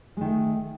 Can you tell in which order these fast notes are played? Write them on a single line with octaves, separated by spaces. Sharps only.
G#3 D#3 A3